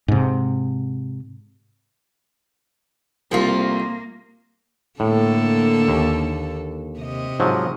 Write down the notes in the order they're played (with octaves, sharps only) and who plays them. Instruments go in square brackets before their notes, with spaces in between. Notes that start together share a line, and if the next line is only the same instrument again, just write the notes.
[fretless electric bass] G#2 C3
[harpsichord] C2 [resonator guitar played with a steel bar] F3 A3 F4 [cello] A#3
[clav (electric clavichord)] A2 [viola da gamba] D3 A#3 A4
[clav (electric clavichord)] D#2
[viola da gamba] C3 D#5
[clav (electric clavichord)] G#2 F3 F#3